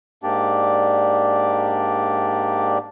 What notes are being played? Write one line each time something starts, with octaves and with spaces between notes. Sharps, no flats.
G#2 A#3 D4 G4 D5